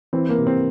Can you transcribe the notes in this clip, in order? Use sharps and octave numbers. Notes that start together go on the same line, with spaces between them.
E3 C4
A#3
C3
C4